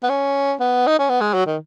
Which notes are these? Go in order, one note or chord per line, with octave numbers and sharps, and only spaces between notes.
B3
C#4
B3
D#4
C#4
B3
G#3
F#3
D#3